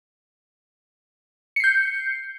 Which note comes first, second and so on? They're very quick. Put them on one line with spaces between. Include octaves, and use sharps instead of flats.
C#7 C7 G6